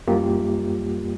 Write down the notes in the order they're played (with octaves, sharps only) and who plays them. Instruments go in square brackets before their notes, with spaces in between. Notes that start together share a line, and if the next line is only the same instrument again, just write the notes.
[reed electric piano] F#2 G3 A#3 F4 G4